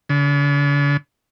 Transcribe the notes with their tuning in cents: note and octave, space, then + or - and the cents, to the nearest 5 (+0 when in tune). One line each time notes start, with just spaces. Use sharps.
D3 -45